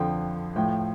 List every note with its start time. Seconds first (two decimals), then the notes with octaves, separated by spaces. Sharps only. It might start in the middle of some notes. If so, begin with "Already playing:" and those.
Already playing: F2 D3 F3 G5
0.56 A2 F3 G5